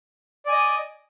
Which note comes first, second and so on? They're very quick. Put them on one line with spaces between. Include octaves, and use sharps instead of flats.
D5 G#5 D#5